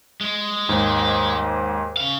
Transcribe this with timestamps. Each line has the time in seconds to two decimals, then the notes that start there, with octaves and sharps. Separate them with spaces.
0.21 G#3
0.69 D#2 G#2
1.97 C#3 F5